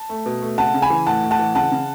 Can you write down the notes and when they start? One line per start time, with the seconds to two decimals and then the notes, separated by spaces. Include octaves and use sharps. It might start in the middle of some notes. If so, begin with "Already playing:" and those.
Already playing: A5
0.09 A3
0.26 B2
0.42 A3
0.58 C#3 F#5 A5
0.74 C#3
0.82 G#5 B5
0.90 E3
1.06 A2 F#5 A5
1.23 A2
1.31 F#5 A5
1.39 E3
1.55 C#3 F#5 A5
1.72 C#3